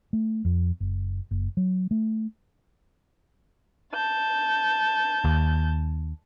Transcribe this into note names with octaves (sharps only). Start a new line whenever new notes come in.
A3
F2
F#1
F#1
F#3
A3
A5 G6
D#2